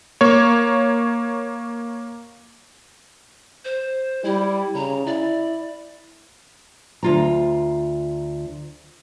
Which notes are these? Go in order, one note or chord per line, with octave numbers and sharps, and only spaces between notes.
A#3 C#5
C5
G3 E4
C#3 A#5
E4 D5
D2 F4 A#5